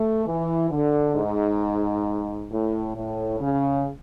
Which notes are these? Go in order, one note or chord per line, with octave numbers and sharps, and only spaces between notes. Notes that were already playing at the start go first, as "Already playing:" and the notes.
Already playing: A3
E3
D3
G#2
A2
A2
C#3